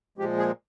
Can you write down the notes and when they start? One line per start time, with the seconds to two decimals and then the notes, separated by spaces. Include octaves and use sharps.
0.18 A#2 F3 G#3 G4
0.38 G#4